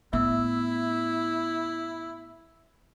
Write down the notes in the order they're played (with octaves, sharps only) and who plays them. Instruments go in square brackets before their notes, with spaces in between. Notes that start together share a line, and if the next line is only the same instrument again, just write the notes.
[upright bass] A2 B3 [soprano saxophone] E4 [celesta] E5 E6